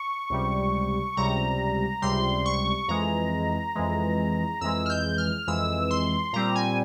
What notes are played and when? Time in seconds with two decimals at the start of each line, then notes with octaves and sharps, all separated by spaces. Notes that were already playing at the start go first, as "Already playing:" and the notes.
Already playing: C#6
0.30 C#2 C3 G3
1.17 C#2 C3 G3 A#5
2.02 C#2 C3 G3 C6
2.46 C#6
2.88 F2 E3 G#3 A#5
3.75 F2 E3 G#3
4.61 F2 E3 G#3 E6
4.86 F6
4.90 G6
5.18 F6
5.47 F2 E3 G#3 E6
5.91 C6
6.33 A#2 G3 C4 A#5
6.55 G#5